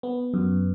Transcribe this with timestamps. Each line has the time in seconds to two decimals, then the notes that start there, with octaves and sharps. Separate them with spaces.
0.03 B3
0.34 F#2